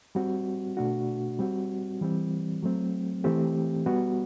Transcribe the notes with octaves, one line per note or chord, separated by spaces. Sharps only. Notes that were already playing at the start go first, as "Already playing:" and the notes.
G3 C4 F#4
B2 A3 D4 F#4
G3 C4 F#4
E3 G3 C4
F#3 A3 C4
E3 A3 C4 G4
G3 B3 F#4